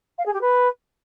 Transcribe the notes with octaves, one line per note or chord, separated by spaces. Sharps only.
F5
G#4
G4
B4